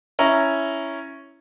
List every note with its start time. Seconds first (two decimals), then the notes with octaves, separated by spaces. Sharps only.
0.19 C#4 E4 A#5